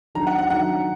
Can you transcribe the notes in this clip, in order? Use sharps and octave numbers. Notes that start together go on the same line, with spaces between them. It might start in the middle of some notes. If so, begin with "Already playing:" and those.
D#3 F#3 D4 F#4 A#5
F#5
F#5
D#3 F#3 D4 F#4 F#5